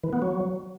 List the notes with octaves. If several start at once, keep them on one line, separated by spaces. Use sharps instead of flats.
E3
B3
F#3